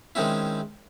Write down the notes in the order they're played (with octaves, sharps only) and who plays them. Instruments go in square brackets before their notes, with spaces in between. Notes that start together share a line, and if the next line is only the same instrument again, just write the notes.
[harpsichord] D#3 G#3 C4 C#4 E4